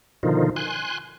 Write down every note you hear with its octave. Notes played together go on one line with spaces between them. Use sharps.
B2 D3 D#3 F3 D#4 F4
G#5 C6 F#6